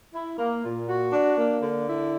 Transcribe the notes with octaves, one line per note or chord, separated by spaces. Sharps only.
E4
A#3
A#2
F#4
D4
A#3
D3
E4